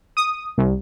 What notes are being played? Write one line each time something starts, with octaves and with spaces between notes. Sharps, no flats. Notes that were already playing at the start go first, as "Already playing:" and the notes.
D#6
C2